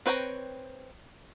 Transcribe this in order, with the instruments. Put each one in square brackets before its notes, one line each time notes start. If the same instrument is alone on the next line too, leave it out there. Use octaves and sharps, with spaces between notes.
[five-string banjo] C4 B4 C#5 G5 A#5